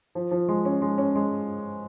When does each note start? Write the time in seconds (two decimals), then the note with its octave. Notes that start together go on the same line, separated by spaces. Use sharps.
0.15 F3
0.31 F3
0.49 G#3
0.65 C#4
0.82 G#3
0.98 C#4
1.16 G#3